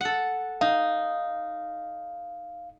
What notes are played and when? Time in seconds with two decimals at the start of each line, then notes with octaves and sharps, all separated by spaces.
0.01 A4 F#5
0.61 D#4 F5